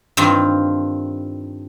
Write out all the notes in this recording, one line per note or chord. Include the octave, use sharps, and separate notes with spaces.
G2 D#3 C4 F4